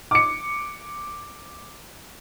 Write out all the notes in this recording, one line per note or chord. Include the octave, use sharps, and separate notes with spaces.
D6 C#7